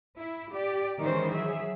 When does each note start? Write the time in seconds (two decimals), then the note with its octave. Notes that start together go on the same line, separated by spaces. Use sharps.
0.19 E4
0.54 G4 D5
1.00 D#3 E3 G#3 C#4 C5
1.32 F#3 G#4 E5